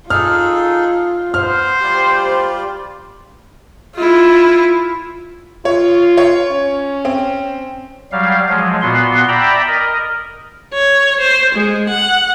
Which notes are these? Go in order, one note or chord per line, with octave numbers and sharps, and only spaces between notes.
D#4 F4 G#4 A4 F6
B3 C5 F6
G3 F4 G4 D5
E4 F4
F4 C#5
C#5
C#4
C4
F#3 G3 F5
F3 F#3 G#3
A#2 B3 F#4 C6
D5 E5 G5 A#5 B5
A#4 D#5
C#5
C5
G#3
F#5